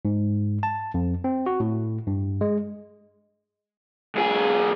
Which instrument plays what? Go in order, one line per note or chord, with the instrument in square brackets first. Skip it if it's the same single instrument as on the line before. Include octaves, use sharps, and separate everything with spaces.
[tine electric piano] G#2
A5
F2
C4
F#4
A2
G2
G#3
[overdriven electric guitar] B1 G#4